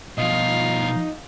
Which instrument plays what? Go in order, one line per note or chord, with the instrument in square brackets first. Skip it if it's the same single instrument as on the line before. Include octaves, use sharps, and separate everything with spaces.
[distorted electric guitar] B2 F3 [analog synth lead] D#4 [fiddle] F4